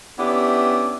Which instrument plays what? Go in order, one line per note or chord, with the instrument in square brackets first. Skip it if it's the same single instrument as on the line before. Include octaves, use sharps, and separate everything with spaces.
[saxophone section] B3 C#4 D4 E4 G4